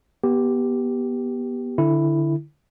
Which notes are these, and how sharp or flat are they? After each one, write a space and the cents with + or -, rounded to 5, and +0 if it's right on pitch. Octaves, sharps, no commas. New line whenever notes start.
B3 -25 G4 +0
D3 +0 E4 +0